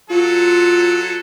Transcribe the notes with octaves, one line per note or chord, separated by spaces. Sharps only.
F#3 F4 A4